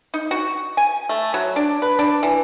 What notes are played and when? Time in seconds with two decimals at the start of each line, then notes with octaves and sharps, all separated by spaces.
0.14 D#4
0.31 F#4
0.77 G#5
1.09 A3
1.34 F#3
1.56 D4
1.82 B4
1.99 D4
2.23 E3